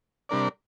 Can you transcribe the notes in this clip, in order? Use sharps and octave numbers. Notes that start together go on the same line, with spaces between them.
C3 G3 D4 A#4 D5